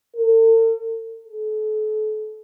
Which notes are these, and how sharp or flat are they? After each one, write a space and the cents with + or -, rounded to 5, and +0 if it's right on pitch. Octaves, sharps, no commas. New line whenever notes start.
A4 +45
A4 -40